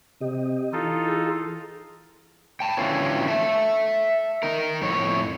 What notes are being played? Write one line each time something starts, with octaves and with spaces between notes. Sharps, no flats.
C3 G4 D#5
E3 D#4 F4 A4
G#4
G5 A5
D3 E3 F#3 C4 C#4 F4
E5 A5
D#4 A#4
F2 A2 C#5